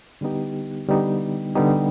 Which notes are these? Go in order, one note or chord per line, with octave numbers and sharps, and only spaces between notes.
D3 G3 B3 D#4 G4
D3 G3 B3 D#4 G4
D3 G3 B3 D#4 G4